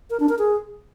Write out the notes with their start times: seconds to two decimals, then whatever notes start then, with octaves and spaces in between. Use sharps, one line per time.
0.10 A#4
0.20 D4
0.29 A#4
0.39 G#4